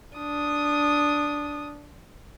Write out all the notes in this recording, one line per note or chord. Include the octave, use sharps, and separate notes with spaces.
D4 D#6